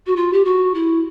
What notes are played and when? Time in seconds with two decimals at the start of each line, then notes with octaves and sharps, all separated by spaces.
0.06 F#4
0.15 F4
0.32 G4
0.44 F#4
0.74 E4